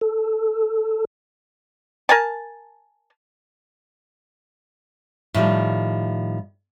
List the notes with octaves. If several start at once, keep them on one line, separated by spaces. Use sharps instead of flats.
A4
A#4 G#5 A5
A2 D#3 F3 G3